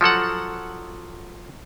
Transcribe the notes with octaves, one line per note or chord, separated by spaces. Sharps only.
F3 F#3 A4 F#5